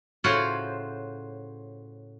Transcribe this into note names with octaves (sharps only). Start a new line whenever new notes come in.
A2 C#3 F4 F#4 C5